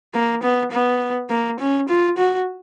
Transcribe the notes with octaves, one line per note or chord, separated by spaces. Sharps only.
A#3
B3
B3
A#3
C#4
F4
F#4